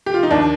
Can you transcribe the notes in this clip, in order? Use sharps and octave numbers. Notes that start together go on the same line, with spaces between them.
G4
F4
D#4
D#2 D4